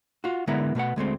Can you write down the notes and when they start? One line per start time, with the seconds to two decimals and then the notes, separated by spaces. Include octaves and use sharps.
0.24 F4 F#4
0.47 D3 G#3 B3 E4 A#4
0.75 B2 A3 B4 F#5
0.96 D2 G#3 A3 C4